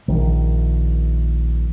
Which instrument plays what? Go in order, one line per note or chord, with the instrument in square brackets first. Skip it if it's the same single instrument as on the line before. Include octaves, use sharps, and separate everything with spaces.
[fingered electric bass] A#1 D#3